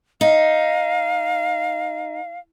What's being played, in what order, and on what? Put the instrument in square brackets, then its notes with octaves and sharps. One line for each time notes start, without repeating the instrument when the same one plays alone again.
[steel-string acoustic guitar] D#4 [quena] F5